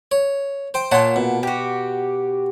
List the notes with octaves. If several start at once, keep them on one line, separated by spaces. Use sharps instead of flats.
C#5
C5 G5
A#2 C#5 F#5 A5 C6
B2
F#4 G4